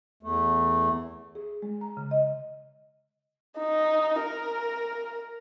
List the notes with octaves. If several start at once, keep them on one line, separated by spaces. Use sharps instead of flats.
E2 A3
G#4
G#3
A#5
C#3
D#5
D#4
A#4